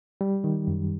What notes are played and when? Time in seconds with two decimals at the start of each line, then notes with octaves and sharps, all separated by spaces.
0.21 G3
0.44 D#3
0.68 F#2